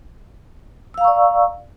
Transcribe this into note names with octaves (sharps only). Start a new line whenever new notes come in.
D5 F5 A#5 C#6 E6